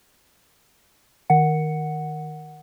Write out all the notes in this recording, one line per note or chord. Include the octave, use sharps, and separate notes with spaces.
D#3 F#5